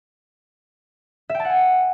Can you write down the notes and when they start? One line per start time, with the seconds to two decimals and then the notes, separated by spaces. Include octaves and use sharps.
1.30 E5
1.35 G5
1.40 A5
1.45 F#5
1.50 G#5